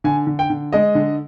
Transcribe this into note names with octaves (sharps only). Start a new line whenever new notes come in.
D3 G#5
D3
G5
D3
G#3 D#5
D3